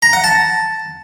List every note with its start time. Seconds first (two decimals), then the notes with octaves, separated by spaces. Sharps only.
0.03 A#5
0.13 F#5
0.24 A5